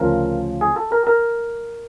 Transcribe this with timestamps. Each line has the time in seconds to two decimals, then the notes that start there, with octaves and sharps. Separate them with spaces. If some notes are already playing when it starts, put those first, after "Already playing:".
Already playing: D2 C#3 F3 A#4
0.61 G#4
0.76 A4
0.92 A#4
1.07 A#4